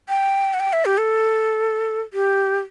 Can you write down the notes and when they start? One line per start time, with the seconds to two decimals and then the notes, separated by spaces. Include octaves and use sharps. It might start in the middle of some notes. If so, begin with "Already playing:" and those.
0.09 G5
0.54 F#5
0.60 G5
0.73 E5
0.85 G4
0.98 A4
2.13 G4